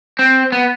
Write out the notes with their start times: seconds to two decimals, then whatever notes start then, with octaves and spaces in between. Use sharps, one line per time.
0.19 C4
0.52 B3